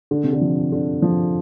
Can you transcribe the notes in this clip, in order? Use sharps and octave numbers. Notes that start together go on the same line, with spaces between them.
D3
C3
D3
F3
D3
F3